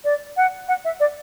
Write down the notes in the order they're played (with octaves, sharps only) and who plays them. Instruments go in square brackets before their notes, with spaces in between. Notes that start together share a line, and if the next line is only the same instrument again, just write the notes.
[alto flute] D5
F#5
F#5
E5
D5